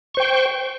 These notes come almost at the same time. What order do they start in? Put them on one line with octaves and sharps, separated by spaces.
C#6 C5 G5